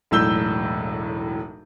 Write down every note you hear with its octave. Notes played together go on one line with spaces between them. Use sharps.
E1 B1 A2 E6 G6 G7